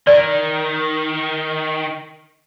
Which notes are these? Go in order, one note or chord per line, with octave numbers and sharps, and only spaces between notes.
D#3 D5